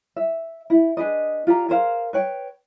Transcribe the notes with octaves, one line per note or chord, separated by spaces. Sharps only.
E5
E4
D4 G#4 B4 D#5
F4 G4 D5 A#5
G#4 A#4 C5 F5
B4 C#5 G5